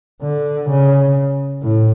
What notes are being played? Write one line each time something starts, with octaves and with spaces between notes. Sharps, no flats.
D3
C#3
A2